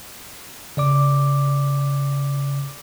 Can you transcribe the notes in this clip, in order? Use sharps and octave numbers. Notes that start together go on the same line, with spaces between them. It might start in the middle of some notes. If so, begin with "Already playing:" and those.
C#3 D5 D6